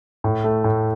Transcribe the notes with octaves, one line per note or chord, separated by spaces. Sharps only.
A2
A3
A2